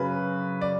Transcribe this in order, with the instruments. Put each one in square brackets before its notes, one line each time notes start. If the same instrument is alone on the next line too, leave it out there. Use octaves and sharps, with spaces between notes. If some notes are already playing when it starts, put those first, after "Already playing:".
Already playing: [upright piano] F#2 C#3 [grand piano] B4
[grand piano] D5